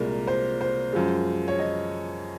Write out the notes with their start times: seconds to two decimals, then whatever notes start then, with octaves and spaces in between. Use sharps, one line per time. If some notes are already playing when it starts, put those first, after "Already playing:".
Already playing: C2 A#2 G#3 A#4
0.27 C5
0.61 C5
0.93 F#2 F3 G#3
1.48 C#5
1.59 D#5